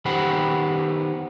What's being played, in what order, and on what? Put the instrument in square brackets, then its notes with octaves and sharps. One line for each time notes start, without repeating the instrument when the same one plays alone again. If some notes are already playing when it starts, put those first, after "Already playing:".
[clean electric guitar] D#3 B3 G4 C5 F#5 B5